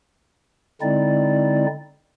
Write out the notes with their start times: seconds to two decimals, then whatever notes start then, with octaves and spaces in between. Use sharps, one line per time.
0.81 D3 G#3 C4 D#4 E4 D5